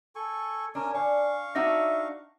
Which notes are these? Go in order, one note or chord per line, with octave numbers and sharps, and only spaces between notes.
A4 G#5 C#6
C#4 D4 A#4 G#5
D5 F5 G#5 C#6
D4 D#4 F#4 E5 A#6